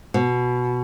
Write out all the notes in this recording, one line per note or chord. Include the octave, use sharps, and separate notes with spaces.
B2